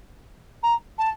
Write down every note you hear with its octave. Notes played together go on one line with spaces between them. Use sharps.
A#5
A5